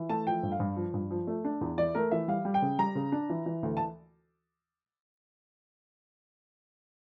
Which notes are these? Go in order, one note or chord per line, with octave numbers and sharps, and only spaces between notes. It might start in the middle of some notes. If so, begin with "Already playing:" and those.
Already playing: E3
A3 A5
F3 G5
G2
F5
G2
F3
G2
F3
A3
D4
E2
E3 D5
A3 A#4
E3 E5
G3 F5
G3
G5
C#3
G3 A#5
C#3
D4
E3
E3
D2
A5